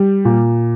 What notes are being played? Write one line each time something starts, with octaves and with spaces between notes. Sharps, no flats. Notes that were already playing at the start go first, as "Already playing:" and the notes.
Already playing: G3
A#2